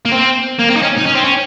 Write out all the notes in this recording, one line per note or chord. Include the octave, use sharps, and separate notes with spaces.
A#3
C4
A#3
C4
D#4
C#4
D#4
C#4
C4
C#4